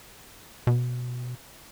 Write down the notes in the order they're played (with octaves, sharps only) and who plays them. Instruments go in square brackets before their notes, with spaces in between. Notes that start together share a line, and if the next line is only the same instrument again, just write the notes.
[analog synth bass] B2